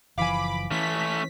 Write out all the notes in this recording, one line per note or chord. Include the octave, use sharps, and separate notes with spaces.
F#1 E3 F3 F5 G#5 B5 D6
E3 A3 C#4 B6